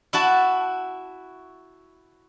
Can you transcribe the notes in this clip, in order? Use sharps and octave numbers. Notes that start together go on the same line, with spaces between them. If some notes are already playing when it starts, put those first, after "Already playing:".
E4 F#4 A5